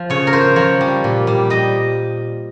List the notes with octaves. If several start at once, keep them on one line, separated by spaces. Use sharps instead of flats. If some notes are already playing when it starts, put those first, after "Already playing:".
Already playing: F3
C#3 C#5
A#4
C#3 C5
F3 C#5
G3
A#2
G3
G3 D#5